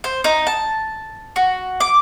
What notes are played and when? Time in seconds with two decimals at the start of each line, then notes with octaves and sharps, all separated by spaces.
0.04 C5
0.24 D#4
0.47 A5
1.36 F#4
1.80 D6